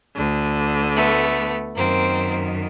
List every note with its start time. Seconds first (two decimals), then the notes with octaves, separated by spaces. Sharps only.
0.15 D2 D3
0.95 A3 B3
1.76 F#2 D#3 A#3 C4